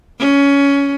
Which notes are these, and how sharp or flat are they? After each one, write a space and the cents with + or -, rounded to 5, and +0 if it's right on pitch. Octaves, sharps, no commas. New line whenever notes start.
C#4 +15